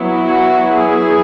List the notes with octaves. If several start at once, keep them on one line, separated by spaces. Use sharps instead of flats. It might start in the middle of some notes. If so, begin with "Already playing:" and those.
Already playing: F#3 B3 E4
F#4
G#4